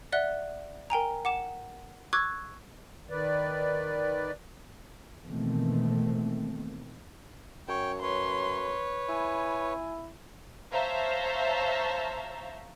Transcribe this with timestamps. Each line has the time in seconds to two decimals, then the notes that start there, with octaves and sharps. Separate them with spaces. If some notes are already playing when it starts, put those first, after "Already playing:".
0.12 D5 E5 F#5 F#6 G7
0.90 A#4 G5 G#5 A#5
1.25 F#5 D6 E7
2.13 C#6 D6 E6 F#6 G#6
3.09 D#3 B4 D5
5.25 B2 D#3 E3 A3 A#3 C4
7.68 F#2 C#5 G5
8.02 B4 C#5 C6
9.09 E4 G#5
10.72 C5 C#5 E5 F5 A5 A#5